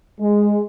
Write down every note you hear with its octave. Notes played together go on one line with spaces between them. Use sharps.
G#3